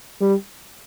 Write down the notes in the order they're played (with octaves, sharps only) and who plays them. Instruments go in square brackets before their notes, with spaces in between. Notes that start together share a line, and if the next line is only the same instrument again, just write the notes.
[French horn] G3